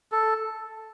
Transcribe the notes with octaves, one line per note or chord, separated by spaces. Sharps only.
A4